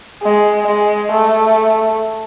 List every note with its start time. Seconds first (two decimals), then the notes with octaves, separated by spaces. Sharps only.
0.23 G#3
0.67 G#3
1.11 A3